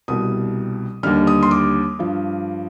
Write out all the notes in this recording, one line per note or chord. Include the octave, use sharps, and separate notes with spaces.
C2 B2 G3 D#6
D#2 D3 G3 F6
D#6
C6
D6
G2 F3